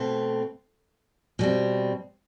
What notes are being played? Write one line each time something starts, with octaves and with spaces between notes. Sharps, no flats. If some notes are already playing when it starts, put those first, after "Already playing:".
Already playing: B2 A3 C4
B2 G3 C4